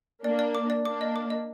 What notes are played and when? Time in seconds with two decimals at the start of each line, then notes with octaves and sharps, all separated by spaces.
0.24 A#3 D4 D5
0.39 D5
0.55 D6
0.70 D5
0.85 A#3 D4 D6
1.01 D#5
1.16 D6
1.30 D#5